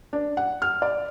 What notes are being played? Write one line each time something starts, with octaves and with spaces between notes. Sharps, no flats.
D4
F#5
F6
D5